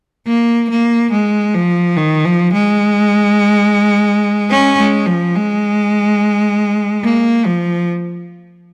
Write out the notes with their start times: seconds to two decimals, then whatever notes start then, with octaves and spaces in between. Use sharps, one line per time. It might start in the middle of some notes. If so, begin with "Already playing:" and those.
0.27 A#3
0.70 A#3
1.12 G#3
1.55 F3
1.97 D#3
2.25 F3
2.53 G#3
4.50 C#4
4.78 G#3
5.06 F3
5.35 G#3
7.03 A#3
7.46 F3